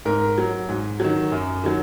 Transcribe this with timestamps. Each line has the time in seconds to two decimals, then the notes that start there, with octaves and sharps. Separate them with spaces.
0.05 G#2 A#4
0.38 F#3
0.69 G#2
1.00 D#3 F#3
1.32 F#2
1.64 D#3 F#3